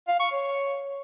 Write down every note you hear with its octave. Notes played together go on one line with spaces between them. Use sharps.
F5
C#6
C#5